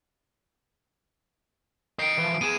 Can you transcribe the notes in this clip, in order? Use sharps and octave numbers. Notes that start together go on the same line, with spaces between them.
D#5 G5 C7 D7
E3 F3
B3 G#4 D#7 E7